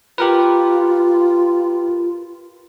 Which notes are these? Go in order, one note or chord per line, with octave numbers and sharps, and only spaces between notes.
F4 G4 A#4 B4